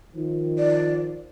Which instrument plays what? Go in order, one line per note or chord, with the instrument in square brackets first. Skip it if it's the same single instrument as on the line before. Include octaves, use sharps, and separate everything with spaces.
[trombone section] D#3 F3
[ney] D5